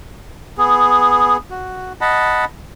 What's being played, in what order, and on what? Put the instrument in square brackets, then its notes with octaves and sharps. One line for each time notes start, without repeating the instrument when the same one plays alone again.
[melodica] B3 G#4
F#4
D#5 F#5 A5 B5